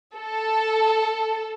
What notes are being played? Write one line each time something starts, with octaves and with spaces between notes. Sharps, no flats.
A4